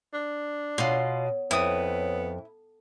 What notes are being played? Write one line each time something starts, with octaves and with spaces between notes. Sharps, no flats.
D4
B2 F4 C#5 C6
F2 B3 E4 D#6